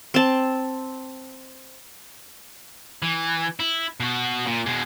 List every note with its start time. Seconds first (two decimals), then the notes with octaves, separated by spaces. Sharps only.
0.14 C4 A5
3.02 E3
3.60 E4
4.00 B2 F#4
4.46 A#2
4.66 B2 G#3